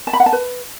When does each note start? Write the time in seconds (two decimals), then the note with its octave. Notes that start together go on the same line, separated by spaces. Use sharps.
0.07 A5
0.13 B5
0.20 F#5
0.26 A5
0.33 B4